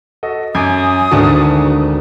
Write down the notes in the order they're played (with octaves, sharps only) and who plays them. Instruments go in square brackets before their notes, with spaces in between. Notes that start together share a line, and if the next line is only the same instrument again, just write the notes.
[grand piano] F#4 A4 D#5
[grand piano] F#2 [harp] G#5 D6 [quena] D#6
[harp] G#1 D2 [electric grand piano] D4 F#4 [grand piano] A5